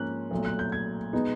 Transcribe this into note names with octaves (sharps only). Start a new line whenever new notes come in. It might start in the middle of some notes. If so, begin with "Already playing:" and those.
Already playing: G#2 F3 A#3 C#4 F#6
B1 A#2 F#3 A3
F#6
G6
G#6
B2 G#3 B3 D#4